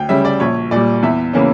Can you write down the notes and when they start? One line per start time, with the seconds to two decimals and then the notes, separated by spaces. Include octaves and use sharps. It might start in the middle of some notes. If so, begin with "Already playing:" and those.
Already playing: D2 G5
0.09 C#3 G3 C#4 E5
0.25 D5
0.40 A#1 C#5
0.71 A#2 G3 D5
1.03 E2 E5
1.33 C#3 E3 A#3 C#4